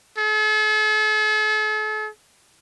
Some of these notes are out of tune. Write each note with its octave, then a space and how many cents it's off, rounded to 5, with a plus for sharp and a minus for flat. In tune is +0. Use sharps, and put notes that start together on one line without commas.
A4 -45